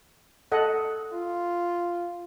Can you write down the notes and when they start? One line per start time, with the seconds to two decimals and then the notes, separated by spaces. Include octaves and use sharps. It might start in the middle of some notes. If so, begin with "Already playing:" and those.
0.52 A4 D#5 F#5
1.13 F4